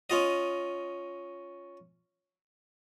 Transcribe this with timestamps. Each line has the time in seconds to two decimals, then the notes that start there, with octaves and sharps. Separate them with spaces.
0.10 C#4 F4 D#5